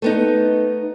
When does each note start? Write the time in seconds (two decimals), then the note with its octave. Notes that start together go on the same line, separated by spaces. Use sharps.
0.02 A3 B3 D#4